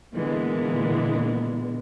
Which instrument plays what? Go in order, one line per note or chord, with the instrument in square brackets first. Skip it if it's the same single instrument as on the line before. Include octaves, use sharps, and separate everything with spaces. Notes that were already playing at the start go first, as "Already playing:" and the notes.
[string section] A#2 D3 E3 G#3 A#3 B3